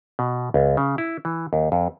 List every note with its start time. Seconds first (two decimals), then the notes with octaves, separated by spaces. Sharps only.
0.19 B2
0.54 C#2
0.77 C#3
0.98 E4
1.25 E3
1.53 D#2
1.72 F2